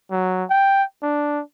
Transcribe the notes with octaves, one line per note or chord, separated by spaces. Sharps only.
F#3
G5
D4